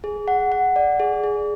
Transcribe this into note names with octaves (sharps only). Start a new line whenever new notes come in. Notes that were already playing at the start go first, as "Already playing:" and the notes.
G#4
F#5
F#5
D5
G#4
G#4